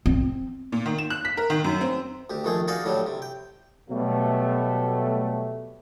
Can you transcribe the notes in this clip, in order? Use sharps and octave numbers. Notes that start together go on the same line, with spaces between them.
C4
A#2
D#3
E7
F#6
B6
A#4
D#3
F#2
C4
D2 G4
A#1 D#3 A3 G#4
D#4 F#4 G#4 D5 D#5 F5
A2 D3 F#3 G3
C3
G5
B2 F#3 G3 A3